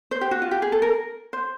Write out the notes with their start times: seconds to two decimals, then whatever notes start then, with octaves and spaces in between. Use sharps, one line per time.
0.11 C5
0.21 G4
0.31 F#4
0.42 F4
0.51 G4
0.62 G#4
0.72 A4
0.82 A#4
1.33 C5